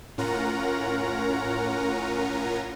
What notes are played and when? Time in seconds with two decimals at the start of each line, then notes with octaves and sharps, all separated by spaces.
0.18 A2 C#4 F4 A#4 F#5 A#5